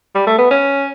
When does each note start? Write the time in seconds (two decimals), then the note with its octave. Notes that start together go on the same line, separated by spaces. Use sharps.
0.15 G3
0.27 A3
0.38 B3
0.51 C#4